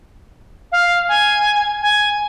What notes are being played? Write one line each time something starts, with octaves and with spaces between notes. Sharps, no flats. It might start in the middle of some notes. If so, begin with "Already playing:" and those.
F5
G#5
G#5